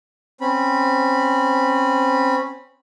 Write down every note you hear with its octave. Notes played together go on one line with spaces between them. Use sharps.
C4 C#4 B5